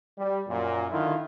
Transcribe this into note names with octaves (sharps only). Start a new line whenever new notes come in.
G3
F#2 A#2
D3 D#3 E4 F4